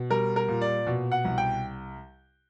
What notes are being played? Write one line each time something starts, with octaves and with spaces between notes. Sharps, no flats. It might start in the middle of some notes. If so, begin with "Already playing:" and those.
Already playing: B2
G3 A#4
A#4
A#2
D5
B2
F#5
C2
G5